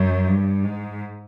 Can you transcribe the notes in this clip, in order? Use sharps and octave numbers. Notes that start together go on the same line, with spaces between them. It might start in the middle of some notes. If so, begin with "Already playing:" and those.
Already playing: F#2
G2
G#2